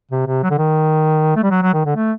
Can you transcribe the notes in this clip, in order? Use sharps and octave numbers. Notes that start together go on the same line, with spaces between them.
C3
C3
F#3
D3
D#3
A3
G3
F#3
F#3
D#3
D3
A3